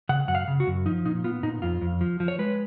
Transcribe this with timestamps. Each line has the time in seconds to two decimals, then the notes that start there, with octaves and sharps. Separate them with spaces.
0.09 C#3 F#5
0.28 F#2 F#5
0.35 F5
0.48 C#3
0.60 F#4
0.67 F#2
0.86 F3 D#4
1.05 A#2 D#4
1.24 B3 F4
1.43 A#2 D#4
1.62 F2 F4
1.81 F2
2.01 F3
2.20 F3
2.28 C#5
2.39 G#3 B4